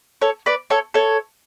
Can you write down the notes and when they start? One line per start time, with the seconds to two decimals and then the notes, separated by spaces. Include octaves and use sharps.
0.22 A4 C#5
0.46 B4 D5
0.70 A4 C#5
0.94 A4 C#5